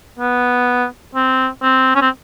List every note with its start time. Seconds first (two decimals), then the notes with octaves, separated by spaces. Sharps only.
0.19 B3
1.15 C4
1.62 C4
1.95 C#4
2.02 C4